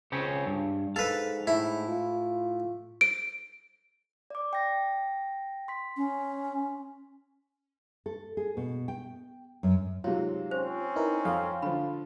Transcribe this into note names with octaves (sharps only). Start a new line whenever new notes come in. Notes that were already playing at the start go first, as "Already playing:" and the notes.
C#2 C#3 C4 C#4
G2
G#2 A4 B4 F5
A2 E4
F4
D7
D5 D6
G5 A#6
C6 B6
C#4
A4
G#4
B2
G5
F#2
G#2 C3 F#3 F4 C#5
C4 C#4 C5
D#4 E4 A#4 B4
F2 A4 F5
D3 F3 B5